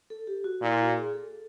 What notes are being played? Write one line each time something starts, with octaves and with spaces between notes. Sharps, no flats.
A4
G4
F#4
A#2 E4
F#4
G#4
A4